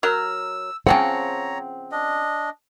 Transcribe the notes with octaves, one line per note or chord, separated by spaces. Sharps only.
F#3 A#4 E6
C#3 F3 C4 C#5 F#5 G5 A#5
D4 D#5